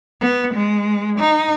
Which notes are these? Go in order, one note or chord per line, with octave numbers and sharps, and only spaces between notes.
B3
G#3
D#4